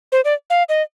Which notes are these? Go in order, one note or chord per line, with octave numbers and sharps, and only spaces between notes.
C5
D5
F5
D#5